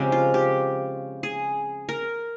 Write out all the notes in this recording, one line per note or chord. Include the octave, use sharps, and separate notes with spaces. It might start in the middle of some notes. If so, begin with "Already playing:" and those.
Already playing: C#3 F3 G#3 C4 G4
F4
G4
G#4
A#4